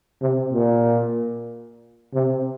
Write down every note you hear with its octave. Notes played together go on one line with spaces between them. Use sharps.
C3
A#2
C3